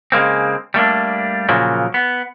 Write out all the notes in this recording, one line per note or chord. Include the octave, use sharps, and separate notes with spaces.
C#3 G#3 A#3 C4
G3 A3 A#3 D4
A#2 C#3 F3 F#3 A#3
B3